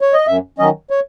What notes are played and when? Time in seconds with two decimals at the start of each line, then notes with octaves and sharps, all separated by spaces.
0.01 C#5
0.13 D#5
0.27 F#2 E5
0.59 D#3 F#3 C#4 D#5
0.90 C#5